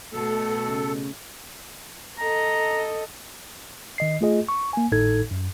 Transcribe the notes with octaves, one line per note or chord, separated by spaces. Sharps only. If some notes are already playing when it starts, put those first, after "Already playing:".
B2 A3 A4
C#3
A4 D#5 A#5
D#3 D#5 C7
A3 F4 G#4 D#5
C#6
A#3 G#5
G#1 A2 D#4 A4 G#6
F#2